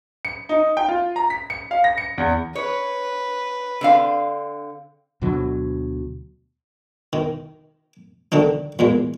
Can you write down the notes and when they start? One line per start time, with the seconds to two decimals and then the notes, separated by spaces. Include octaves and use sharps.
0.25 C#7
0.49 D#4
0.77 G5
0.88 F4
1.16 A#5
1.30 B6
1.50 C#7
1.71 F5
1.84 A#6
1.98 C#7
2.18 E2
2.55 B4 C#5
3.81 D3 C4 F5
5.21 D2 B2 D3 F#3
7.13 D#3
8.32 D3 D#3 D4 D#4
8.79 E2 A#2 G#3